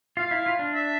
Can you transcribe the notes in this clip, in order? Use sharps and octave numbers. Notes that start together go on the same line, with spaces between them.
F4 F5
E4
F4
D4
E5